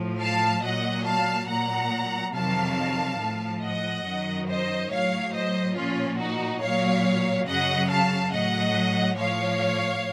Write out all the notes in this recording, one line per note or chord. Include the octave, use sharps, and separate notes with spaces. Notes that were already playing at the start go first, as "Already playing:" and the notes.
Already playing: A2 F3
F5 A5
A#2 F#3 D#5 F#5
F5 A5
A#2 F#3 F#5 A#5
F2 C3 D#3 F#3 F5 A5
A2 F3
D#5 F#5
F#2 D#3 F#3
C5 D#5
A2 F#3 C#5 F5
C5 D#5
A#2 F3 C#4 F4
D#4 F#4
A#2 F#3 C#5 F5
F#2 C#3 F#3 D#5 F#5
F5 A5
A2 F#3 D#5 F#5
A2 F3 C#5 F5